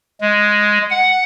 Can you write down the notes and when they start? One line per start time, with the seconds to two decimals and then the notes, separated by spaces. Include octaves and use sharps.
0.21 G#3
0.90 F#5